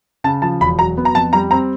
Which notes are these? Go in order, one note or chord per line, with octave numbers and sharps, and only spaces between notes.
C#3 A5
F3 A5
E1 B5
F#3 A#5
B3
A#5
F2 A5
G3 A#5
C4 A#5